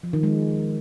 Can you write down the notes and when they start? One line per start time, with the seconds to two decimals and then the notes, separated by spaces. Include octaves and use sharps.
0.03 F3
0.13 D#3
0.23 G#3